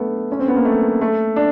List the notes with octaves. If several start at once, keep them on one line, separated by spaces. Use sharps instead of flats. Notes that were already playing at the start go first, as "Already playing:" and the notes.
Already playing: A3 B3
C#4
C4
B3
A#3
A3
A3
D4